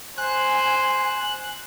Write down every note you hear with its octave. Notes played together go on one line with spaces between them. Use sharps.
C5 G#5 F#6